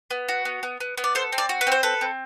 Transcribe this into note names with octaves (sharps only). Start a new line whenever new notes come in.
B3
F#4
B3
B3
B3
B3
D5
A4 C5
C4
D5
F#4
B4
C4 C5
A4 B4
C4